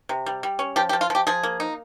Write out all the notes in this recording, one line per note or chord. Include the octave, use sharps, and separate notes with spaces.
C3
G3
G3
C#4
F3 G4
G4
F3
F4
F3 G4
F3 G#4
A#3
D#4